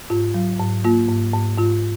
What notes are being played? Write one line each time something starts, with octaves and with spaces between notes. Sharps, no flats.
G#2 F4
F#3
G#2
A#3 F4
G#2
G#2
G#2 F4